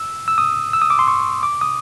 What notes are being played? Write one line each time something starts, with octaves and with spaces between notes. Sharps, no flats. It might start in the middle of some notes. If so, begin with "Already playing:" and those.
Already playing: E6
E6
D#6
E6
D#6
D6
C6
C#6
D6
D#6